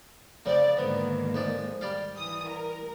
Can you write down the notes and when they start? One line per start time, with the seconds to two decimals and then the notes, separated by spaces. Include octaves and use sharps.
0.46 F2 C#3 C4 D5
0.77 G#2 D3 D#3 A#3 B3
1.34 F2 G#3 D5
1.81 G3 D5 F5
2.17 E3 D#6
2.47 A#4